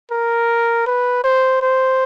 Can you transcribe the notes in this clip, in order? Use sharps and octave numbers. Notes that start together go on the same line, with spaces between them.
A#4
B4
C5
C5